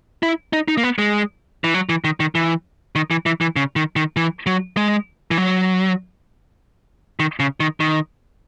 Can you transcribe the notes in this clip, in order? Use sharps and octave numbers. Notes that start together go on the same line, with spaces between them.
E4
D#4
D#4
A#3
B3
G#3
E3
F#3
E3
D#3
D#3
E3
D#3
E3
E3
E3
C#3
D#3
D#3
E3
F#3
G#3
E3
F#3
D#3
C#3
D#3
D#3